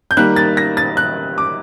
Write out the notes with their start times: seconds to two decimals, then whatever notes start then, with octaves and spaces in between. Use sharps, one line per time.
0.11 G6
0.17 D#3 G3 A#3 F#6
0.36 A6
0.57 A#6
0.77 A6
0.97 F#6
1.38 D6